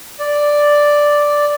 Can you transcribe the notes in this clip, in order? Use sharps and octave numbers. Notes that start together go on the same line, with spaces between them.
D5